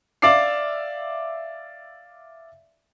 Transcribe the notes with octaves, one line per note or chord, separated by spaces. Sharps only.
D5 E5 F5 D6 C7